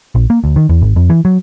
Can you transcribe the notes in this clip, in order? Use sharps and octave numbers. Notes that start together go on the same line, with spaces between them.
A#1
A#3
D2
D#3
E2
G#1
F2
E3
F#3